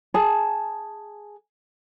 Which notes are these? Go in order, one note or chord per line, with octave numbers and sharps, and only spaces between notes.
G#4 A5